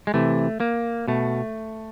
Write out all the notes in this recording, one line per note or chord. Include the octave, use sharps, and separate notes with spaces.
G#3
C3 E3 A3
A#3
B2 A3